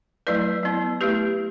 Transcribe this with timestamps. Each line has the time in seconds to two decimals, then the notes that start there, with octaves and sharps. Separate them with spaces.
0.27 F#3 A3 E4 B4 D5
0.63 F#3 B3 E4
1.01 A3 E4 G4 B4